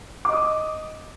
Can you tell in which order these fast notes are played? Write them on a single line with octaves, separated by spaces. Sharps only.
D6 D#5 D#6